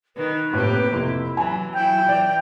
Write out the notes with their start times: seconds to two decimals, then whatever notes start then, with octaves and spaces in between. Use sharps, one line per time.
0.16 D#3 B4
0.53 A2 C3 A#3 G4
0.92 F1 E4
1.37 E3 F#3 G#5 B5
1.74 F#3 E4 G5
2.09 E3 D5